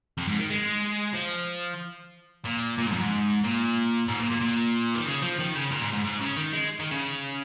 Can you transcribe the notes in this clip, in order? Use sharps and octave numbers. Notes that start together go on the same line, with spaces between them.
F2
G#2
D#3
G#3
F3
A#2
A#2
G#2
F2
G#2
A#2
G#2
A#2
A#2
A#2
D#3
C#3
F3
D#3
C#3
A#2
G#2
G#2
G#2
C#3
D#3
G#3
D#3
C#3